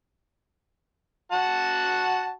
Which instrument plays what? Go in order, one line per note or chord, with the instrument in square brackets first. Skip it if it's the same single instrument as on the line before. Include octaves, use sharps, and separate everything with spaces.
[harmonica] F#4 F#5 A5